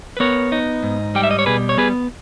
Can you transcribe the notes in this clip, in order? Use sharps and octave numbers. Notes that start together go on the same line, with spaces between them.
B4
B3 A#4 C#5
D#4
G#2
G3 G5
E5
D#5
C#5
B2 G#4 B4
C#5
B3 G#4 B4